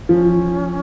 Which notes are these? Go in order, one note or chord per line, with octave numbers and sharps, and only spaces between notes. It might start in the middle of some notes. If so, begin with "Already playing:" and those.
F3 C#4